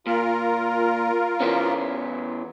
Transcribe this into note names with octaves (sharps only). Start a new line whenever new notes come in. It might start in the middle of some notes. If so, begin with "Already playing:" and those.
A#2 F4 A#4
E2 B3 C#4